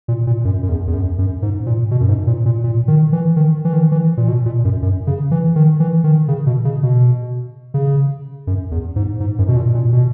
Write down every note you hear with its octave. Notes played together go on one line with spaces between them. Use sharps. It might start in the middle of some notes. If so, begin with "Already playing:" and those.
A#2
A#2
F#2
F#2
E2
E2
F#2
F#2
G#2
A#2
B2
F#2
G#2
A#2
A#2
A#2
D#3
E3
D#3
E3
D#3
E3
A#2
B2
A#2
F#2
F#2
C#3
E3
D#3
E3
D#3
C#3
B2
C#3
B2
C#3
F#2
E2
G#2
G#2
F#2
B2
A#2
A#2
B2